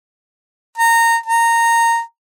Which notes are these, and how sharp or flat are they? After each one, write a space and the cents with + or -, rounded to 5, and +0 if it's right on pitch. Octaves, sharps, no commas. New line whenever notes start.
A#5 -20
A#5 -15